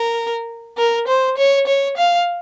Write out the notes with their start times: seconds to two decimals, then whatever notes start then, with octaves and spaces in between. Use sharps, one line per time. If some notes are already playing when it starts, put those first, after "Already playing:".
Already playing: A#4
0.77 A#4
1.08 C5
1.37 C#5
1.67 C#5
1.97 F5